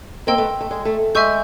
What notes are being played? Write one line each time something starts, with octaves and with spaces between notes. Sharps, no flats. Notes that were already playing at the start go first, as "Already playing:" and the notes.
A#3 C4 D#5 G5 C6 E6
A3 B3
A3
G#3
A3
G#3 E5 G#5 C#6 E6 G6